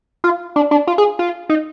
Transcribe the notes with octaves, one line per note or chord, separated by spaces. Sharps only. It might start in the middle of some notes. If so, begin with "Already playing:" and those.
F4
D4
D4
F4
G#4
F4
D#4